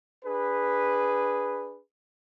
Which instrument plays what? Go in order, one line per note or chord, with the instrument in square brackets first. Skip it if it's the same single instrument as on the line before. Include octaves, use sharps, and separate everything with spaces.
[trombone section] D4 G#4 B4